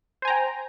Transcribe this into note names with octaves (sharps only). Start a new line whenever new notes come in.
C5 G5 G#5 A#5